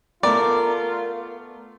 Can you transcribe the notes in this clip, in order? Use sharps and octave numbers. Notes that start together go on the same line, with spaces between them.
A3 B3 F4 A#4 D5